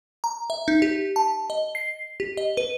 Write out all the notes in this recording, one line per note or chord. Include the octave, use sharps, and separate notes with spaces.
A#5
E5
D#4
G4
A5
D#5
C7
G4
D#5
B4